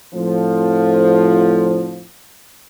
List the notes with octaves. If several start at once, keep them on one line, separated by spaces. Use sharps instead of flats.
F2 A2 D3 F3